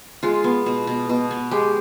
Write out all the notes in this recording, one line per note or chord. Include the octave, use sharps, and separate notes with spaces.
G#3 F4
B3
B2
B2
B2
B3
G#3 G4